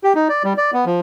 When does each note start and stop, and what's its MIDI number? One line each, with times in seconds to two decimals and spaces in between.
0.04 0.13 67
0.15 0.28 63
0.29 0.43 74
0.44 0.53 55
0.58 0.71 74
0.73 0.85 59
0.86 1.00 53